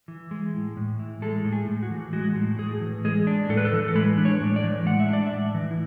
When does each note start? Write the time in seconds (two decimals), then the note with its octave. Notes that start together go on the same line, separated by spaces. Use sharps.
0.08 E3
0.31 G#3
0.54 A2
0.77 A2
0.99 E3
1.22 G#3 A4
1.45 A2
1.52 G#4
1.68 A2
1.83 F#4
1.90 E3
2.13 G#3 F#4
2.36 A2
2.59 A2 G#4
2.81 E3
3.05 G#3 G#4
3.27 D4
3.49 A2 A4
3.57 B4
3.65 A4
3.72 E3
3.88 A4
3.95 G#3 B4
4.18 D4
4.25 C#5
4.41 A2
4.56 D5
4.64 E3
4.86 G#3 F#5
5.00 E5
5.09 D4 D5
5.27 A2 E5
5.54 E3
5.71 E4